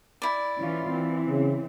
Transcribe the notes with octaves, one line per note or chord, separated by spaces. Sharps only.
E4 D5
E3 C#4 F4
E3 C4
C#3